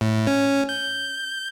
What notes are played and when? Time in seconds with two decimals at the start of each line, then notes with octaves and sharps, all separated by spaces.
0.01 A2
0.27 C#4
0.69 G6